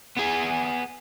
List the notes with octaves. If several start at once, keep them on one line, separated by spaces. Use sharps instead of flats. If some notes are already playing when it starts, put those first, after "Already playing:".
B3 G#4